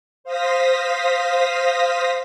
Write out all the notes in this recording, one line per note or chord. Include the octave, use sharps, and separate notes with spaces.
C5 F5 D#6 A#6 B6